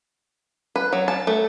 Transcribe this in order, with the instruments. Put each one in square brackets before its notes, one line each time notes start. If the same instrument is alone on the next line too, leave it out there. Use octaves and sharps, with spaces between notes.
[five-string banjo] B4
F#3
A5
A3